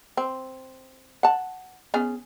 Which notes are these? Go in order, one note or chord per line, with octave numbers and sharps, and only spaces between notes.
C4
F#5 A5
B3 C#4 G#4